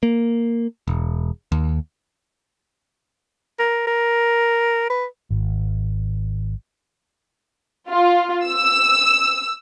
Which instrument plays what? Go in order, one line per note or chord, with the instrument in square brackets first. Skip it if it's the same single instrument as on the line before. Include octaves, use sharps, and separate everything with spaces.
[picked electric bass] A#3
E1
D#2
[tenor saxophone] A#4
A#4
B4
[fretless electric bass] G#1
[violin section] F4
E6